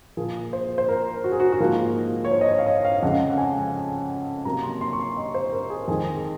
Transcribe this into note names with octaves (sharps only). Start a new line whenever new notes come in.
A#2 F3 A#3 G#4
C5
C5
A#4
F#4
G#4
F#4
F#4
G#2 F3 A#3 G#4
C#5
C5
D#5
C#5
F5
D#5
F5
F5
F2 C#3 G#3 F#5
F#5
G#5
C3 F#3 A#3 A#5
C6
C6
C#6
C6
D#5
C5
A#4
G#4
F2 D#3 G#3 G#4